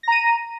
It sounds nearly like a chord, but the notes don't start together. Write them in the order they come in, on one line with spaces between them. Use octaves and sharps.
A#6 A#5 D#7